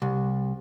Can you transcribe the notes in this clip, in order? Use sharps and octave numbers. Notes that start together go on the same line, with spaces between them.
C2